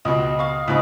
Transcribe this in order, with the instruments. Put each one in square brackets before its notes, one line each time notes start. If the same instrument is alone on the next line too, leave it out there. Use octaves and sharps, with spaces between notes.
[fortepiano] C#2 B2 [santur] D#5
[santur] F5 C#6
[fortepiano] C#2 G#2 D3 [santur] B4 D#5